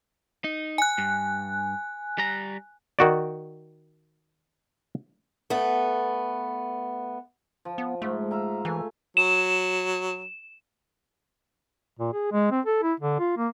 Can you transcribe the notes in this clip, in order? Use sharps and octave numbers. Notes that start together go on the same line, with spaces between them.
D#4
G#5 F#6
G2
G3 A#5
D#3 F#4 D5
A3 B3
F3
B3
G#2 A3
F4 E5 A#5
E3 A3 G#5
F#3 E7
A#2
G#4
G#3
C4
A4
E4
D3
F4
A#3